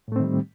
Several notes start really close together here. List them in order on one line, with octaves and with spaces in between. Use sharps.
A2 A3 C4 D#3 G3